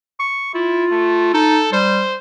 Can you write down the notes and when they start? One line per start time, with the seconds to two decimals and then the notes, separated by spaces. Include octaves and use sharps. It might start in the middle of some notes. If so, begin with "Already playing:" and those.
0.20 C#6
0.55 E4 F4
0.92 A3
1.34 D#4 A4
1.73 G3 C5